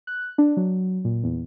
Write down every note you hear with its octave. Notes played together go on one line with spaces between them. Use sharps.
F#6
D4
F#3
A#2
E2